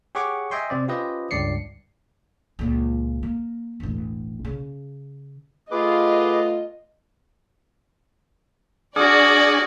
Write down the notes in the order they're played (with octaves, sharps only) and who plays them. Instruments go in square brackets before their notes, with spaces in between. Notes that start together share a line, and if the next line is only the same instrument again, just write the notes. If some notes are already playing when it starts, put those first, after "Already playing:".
[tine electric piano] G4 G#4 C#5 F#5 C#6 D6
D#5 E5 G5 G#5 C6
C3 C4 D5
C#4 F4 G4 B4 C5 D#5
C#2 G2 D5 C7 C#7
[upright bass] C#2 A#2
A#3
E1 A1
C#3
[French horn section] A3 B3 F4 [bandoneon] G#4 B4 D6 [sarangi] D#5
[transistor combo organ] D4 G#4 [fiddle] F#4 [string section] D5 [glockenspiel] D#6 F6